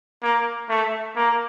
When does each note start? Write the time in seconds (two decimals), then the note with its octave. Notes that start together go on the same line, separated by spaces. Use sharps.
0.23 A#3
0.69 A3
1.16 A#3